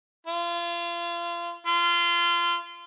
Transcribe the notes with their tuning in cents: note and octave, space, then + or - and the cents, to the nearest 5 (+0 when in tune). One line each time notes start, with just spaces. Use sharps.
F4 -30
F4 -25